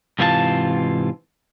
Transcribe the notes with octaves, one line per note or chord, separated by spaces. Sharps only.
G#2 C3 E3 F4 G#4 A5